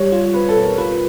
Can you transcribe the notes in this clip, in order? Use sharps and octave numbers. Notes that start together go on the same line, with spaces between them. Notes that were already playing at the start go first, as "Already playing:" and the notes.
Already playing: G3 C#5
F4
C4 B4
A4
B2
A#4
F4 B4